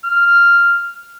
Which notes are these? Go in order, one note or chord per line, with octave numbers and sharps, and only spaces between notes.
F6